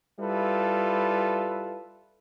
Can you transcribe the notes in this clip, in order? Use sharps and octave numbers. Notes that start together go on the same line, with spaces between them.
G3 E4 F4 A4 B4